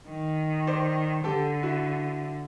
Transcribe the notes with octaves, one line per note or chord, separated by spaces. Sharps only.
D#3
C5 D5
D3 G4 A4
E4 F#4